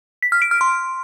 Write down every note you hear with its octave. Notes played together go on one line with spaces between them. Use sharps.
B6
F6
D7
F6
C6